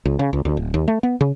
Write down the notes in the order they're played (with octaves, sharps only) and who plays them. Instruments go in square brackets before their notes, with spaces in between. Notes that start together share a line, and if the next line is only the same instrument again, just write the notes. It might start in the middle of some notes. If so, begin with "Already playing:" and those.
[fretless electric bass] C#2
C#3
C#2
D2
D1
D#2
A3
B3
C#3